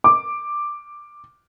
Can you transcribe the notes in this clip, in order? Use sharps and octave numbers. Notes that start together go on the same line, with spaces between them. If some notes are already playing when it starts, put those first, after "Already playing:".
D6